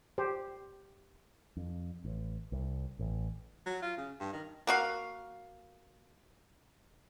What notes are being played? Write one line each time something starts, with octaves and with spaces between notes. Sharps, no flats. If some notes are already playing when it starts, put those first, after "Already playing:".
G4 C5
F2
A1
C2
A1
F#3
F4
C#3
G2
D#3
A#3 F#4 F5